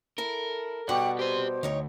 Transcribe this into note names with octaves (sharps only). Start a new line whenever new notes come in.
E4 A4 A#4
B2 G3 F#5 G5 C#6 D6
G4 C5 C6
D2 D#4 C#5 G5